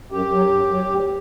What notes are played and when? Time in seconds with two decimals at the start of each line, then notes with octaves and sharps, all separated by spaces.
0.11 F#2 G4
0.32 F#3
0.51 F#2
0.70 F#3
0.90 D2